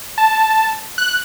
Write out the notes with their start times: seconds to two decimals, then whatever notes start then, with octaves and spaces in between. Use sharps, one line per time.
0.18 A5
0.98 F#6